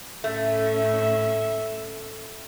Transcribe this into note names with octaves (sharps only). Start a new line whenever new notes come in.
A2 A3 C#4 E5